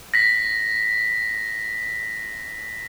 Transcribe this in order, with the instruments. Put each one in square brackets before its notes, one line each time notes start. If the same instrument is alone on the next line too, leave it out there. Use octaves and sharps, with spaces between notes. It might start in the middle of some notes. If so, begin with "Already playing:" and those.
[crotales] A#6 B6